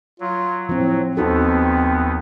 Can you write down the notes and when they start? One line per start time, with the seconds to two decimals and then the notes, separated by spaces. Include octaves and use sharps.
0.20 F#3 F4
0.69 A2 F3 C4
1.17 D#2 B3 C4 D#4 F#4 A4